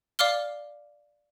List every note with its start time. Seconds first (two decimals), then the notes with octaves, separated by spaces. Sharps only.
0.19 D5 F5 D6 F6 G7